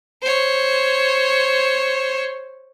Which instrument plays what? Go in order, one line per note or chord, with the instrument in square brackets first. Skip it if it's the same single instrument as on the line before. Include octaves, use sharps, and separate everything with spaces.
[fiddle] C5 C#5